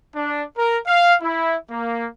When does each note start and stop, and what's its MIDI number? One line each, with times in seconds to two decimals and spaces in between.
0.14 0.43 62
0.58 0.78 70
0.87 1.14 77
1.22 1.55 64
1.71 2.05 58